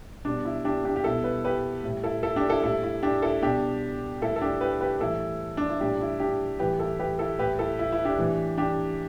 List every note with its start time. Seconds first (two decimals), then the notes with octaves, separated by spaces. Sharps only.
0.25 B2 G3 D4
0.45 E4
0.65 D4 G4
0.85 D4 G4
0.96 G4
1.04 B2 G3 E4 A4
1.24 B4
1.45 G4 B4
1.84 A2 G3
2.04 E4 A4
2.23 E4 A4
2.36 D4 G4
2.50 E4 A4
2.63 A2 G3 E4 A4
2.83 E4
3.03 D4 G4
3.22 E4 A4
3.42 B2 G3 D4 G4
4.22 A2 G3 E4 A4
4.36 A4
4.41 D4 G4
4.61 G4 B4
4.81 G4 B4
5.01 A2 E3 G3 E4 A4
5.57 D4
5.69 E4
5.80 A2 G3 D4 G4
6.01 E4
6.20 D4 G4
6.59 A2 E3 G3 G4 B4
6.79 E4 A4
6.99 G4 B4
7.19 E4 A4
7.39 A2 G3 G4 B4
7.59 E4 A4
7.79 E4
7.92 E4
8.05 D4 G4
8.18 A2 E3 G3
8.58 D4 G4